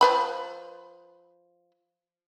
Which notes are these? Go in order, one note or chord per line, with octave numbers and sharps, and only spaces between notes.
F3 B4 B5